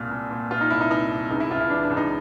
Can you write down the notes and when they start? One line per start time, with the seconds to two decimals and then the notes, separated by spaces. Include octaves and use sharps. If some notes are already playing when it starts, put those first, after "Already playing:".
Already playing: C2 A#2 F4
0.11 A#2
0.31 A#2
0.51 A#2 F4
0.61 D#4
0.70 C2 E4
0.80 D#4
0.91 C2 D#4
1.11 C2
1.31 C#2 D#4
1.40 E4
1.51 C#2 F4
1.60 E4
1.70 E3 D4
1.83 D4
1.90 C#2
1.97 D#4